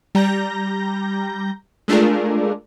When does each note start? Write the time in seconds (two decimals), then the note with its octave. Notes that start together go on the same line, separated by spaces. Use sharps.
0.15 G3 A#5 G6 A#6
1.88 G#3 A3 D4 F4 G#4 A#4